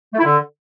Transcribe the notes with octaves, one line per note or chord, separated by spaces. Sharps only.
A3
E4
D3